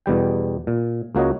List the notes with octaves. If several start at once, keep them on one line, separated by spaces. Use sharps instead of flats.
E2 B2 G3 G5
A#2
C#2 A#3 F#4 C#5 D#5